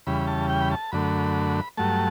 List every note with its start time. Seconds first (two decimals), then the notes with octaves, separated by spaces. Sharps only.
0.07 E2 C#3 G3 B5
0.27 A5
0.49 G5
0.61 B5
0.71 A5
0.92 F#2 D3 A3 B5
1.78 G2 F#3 A3 A5